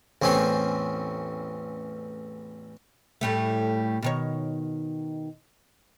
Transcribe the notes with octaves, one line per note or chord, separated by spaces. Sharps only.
A1 E2 C4 C#4 C5 C#5
A2 G3 A3
B2 D#3 C#5